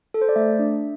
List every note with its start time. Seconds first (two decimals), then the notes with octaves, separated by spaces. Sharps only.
0.14 A4
0.21 C5
0.29 D5
0.36 A3 E5
0.59 D4